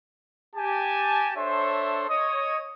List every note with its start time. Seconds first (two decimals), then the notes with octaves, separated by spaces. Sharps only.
0.55 G4 G#5 A5
1.37 D4 A4 C5 C#5 E5 C6
2.09 C#5 D#5 D#6